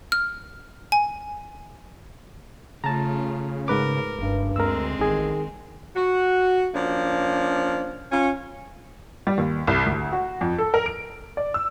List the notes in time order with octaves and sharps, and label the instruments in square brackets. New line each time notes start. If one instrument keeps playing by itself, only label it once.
[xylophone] F6
G#5
[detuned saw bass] C#3 [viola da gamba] A3 F4 [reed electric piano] A5 A#5
[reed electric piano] G#2 B4 D6 [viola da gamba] A#4
[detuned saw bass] F#1 [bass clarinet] G2
[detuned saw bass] D2 [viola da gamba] G#3 C4 [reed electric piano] A#4 E6
[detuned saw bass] A1 [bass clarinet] D#3 [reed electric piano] D#4 G#4
[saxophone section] F#4
F3 A#3 C#4 D4
C#4 F4
[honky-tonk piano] G3
D#2
C2
D2
F#4
F2
A4
A#4
D7
D5
E6